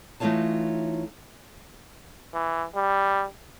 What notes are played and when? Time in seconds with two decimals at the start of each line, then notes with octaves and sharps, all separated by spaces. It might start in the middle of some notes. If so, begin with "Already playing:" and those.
0.20 E3 A3 D#4 F4 C#5 A5
2.34 E3
2.75 G3